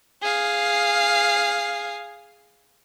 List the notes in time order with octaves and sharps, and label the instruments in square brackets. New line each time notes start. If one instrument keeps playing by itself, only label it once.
[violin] G#4 F5